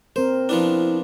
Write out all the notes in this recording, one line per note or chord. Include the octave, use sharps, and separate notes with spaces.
C4 A#4 C5
F3 B3 D4 E4